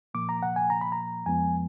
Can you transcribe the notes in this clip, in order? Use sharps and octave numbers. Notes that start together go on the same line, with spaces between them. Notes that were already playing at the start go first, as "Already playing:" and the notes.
A#2 F3 A#3 D6
A#5
F#5
G#5
A#5
B5
A#5
F2 F3 G#3 B3 G#5